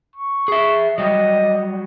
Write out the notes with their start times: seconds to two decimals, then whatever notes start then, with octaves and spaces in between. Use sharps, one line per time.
0.16 C#6
0.48 G#4 E5
0.98 F#3 G3 D#5